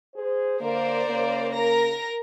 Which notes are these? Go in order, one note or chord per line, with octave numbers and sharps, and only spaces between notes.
G#4 C5
D3 A#3 A#4 C5 D5
C#3 A#3
A#4 A#5 A#6